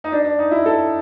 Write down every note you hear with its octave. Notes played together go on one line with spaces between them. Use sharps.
D#4
D4
D4
D#4
E4
A4